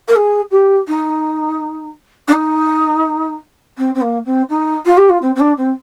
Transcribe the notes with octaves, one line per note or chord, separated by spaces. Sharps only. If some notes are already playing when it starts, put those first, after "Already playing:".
A#4
G#4
G4
D#4
D4
D#4
C4
C4
A#3
C4
D#4
F4
G4
F4
C4
C4
D4
C4